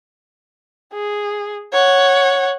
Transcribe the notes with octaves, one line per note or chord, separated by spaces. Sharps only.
G#4
C#5 F#5